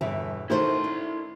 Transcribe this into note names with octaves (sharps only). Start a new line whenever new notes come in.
G1 E2 B2 E5
D#3 A3 D#4 E4 F#4 A#4 C5 C6
D4